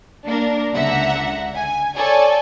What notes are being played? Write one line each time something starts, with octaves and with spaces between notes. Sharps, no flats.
A#3 D4 A#4
C#2 D3 E5 F#5 A#5
G#5
A4 C#5 D5 G#5